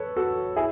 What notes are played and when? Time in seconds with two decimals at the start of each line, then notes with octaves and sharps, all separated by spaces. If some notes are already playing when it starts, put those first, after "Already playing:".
Already playing: A4 B4 C#5
0.16 F#4 A4
0.56 E4 G#4